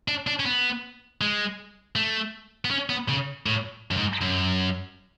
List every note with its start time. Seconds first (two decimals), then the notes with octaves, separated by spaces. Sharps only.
0.08 D4
0.27 D4
0.40 C#4
0.46 B3
1.21 G#3
1.96 A3
2.65 B3
2.71 C#4
2.90 B3
3.09 C#3
3.46 A2
3.91 F#2
3.97 G#2
4.21 F#2